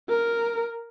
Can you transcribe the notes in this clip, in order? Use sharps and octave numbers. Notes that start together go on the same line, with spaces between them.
A#4